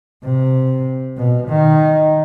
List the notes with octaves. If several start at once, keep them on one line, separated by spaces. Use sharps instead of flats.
C3
B2
D#3